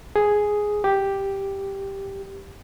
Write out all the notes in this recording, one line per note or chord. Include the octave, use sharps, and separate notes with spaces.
G#4
G4